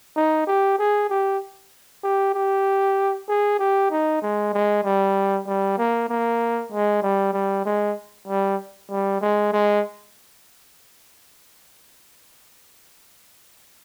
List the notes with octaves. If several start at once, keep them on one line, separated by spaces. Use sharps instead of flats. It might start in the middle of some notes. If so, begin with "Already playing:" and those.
D#4
G4
G#4
G4
G4
G4
G#4
G4
D#4
G#3
G#3
G3
G3
A#3
A#3
G#3
G3
G3
G#3
G3
G3
G#3
G#3